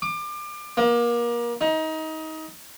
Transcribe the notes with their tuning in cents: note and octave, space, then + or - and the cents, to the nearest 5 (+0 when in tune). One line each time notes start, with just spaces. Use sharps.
D6 +30
A#3 +30
D#4 +25